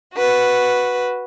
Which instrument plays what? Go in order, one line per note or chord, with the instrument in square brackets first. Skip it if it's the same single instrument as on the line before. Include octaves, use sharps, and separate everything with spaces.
[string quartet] F#4 B4